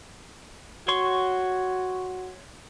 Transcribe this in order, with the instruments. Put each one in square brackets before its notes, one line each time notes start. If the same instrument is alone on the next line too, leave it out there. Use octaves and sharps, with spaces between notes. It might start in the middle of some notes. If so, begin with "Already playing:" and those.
[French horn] F#4 [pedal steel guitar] C#5 C6 C#6